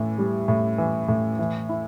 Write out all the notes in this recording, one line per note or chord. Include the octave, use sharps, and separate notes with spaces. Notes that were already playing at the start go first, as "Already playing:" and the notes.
Already playing: A2 E3
G3
A2
E3
A2
E3
E4